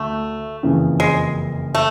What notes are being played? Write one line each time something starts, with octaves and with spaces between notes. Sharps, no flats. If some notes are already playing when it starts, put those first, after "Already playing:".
Already playing: D2 A3
F#1 F2 C#3 E3
G#3
A3